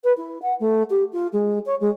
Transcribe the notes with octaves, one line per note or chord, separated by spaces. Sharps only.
B4
E4
F#5
A3
G4
F4
G#3
C#5
G#3